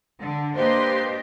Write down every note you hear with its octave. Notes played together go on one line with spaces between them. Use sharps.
D3
A#3 D4 G4 B4 C5 D#5 C6